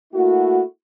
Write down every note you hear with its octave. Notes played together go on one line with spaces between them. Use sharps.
A3 A#3 E4 F#4